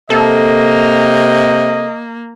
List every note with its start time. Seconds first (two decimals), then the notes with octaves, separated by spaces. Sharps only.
0.10 C3 A#3 A4 D#5